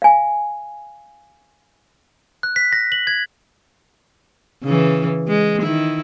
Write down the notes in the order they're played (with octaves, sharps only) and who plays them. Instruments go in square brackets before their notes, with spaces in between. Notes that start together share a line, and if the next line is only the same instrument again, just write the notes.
[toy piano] F5 G#5
[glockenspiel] F#6
B6
A#6
F#7
G#6
[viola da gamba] C#3 E3
G#3
D#3 E4